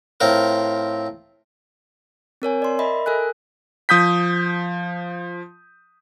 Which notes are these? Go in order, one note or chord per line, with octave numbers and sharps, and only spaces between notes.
A2 C4 F4 A#4
C4 A#4 C#5 G#5
D5 C6
A#4 D#5 E5 B5
A4 A#4 G#5 F#6
F3 D#6 G6 B6